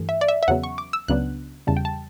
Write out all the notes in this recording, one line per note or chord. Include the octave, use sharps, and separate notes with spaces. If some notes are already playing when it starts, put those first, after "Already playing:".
Already playing: G2 E3 A3
E5
D5
E5
E5
E2 C#3 F#3 B3 F#5
C#6
D6
E6
C#2 C#3 F#3 B3 D4 F#6
E2 C#3 G3 A5
G5
A5